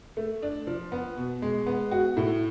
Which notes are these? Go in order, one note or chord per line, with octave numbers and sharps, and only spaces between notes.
A3
D4
F3
B3
B2
G#3
B3
F#4
A2